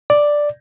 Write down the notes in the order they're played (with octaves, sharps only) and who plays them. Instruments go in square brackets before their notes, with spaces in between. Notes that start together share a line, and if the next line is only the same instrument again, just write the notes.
[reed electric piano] D5